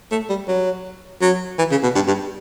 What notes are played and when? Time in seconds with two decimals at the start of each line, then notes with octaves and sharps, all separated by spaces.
0.11 A3
0.30 G3
0.48 F#3
1.21 F#3
1.59 E3
1.71 C#3
1.83 B2
1.95 G2
2.08 G2